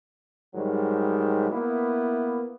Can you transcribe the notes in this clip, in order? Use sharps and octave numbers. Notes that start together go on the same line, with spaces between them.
G#2 D#3 F#3 G3
A#3 B3 E4